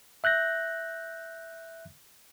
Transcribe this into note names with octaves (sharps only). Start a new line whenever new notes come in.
E5 F#6 G6 A#6